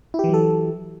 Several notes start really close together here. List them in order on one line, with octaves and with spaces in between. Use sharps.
E4 G4 E3 F#3 A4